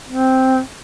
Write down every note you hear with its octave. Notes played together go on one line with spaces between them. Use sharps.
C4